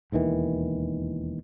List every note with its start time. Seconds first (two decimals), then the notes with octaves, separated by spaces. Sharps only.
0.12 E1 D#2 D#3 E3